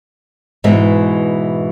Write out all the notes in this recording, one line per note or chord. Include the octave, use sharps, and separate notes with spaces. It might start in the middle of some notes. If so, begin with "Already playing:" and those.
G#2 B2 E3 G#3